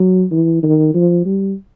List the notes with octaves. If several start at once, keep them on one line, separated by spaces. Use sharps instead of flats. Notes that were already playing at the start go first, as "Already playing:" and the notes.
Already playing: F#3
E3
D#3
F3
G3